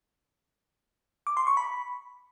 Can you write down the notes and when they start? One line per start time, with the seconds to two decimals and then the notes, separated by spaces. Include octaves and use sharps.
1.27 D6
1.37 C6
1.47 C#6
1.57 B5